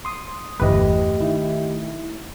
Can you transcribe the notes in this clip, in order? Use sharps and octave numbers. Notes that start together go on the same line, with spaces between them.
C6 D#6
G1 E2 G2 E3 A3 G4 B4 D#5
D#3 E4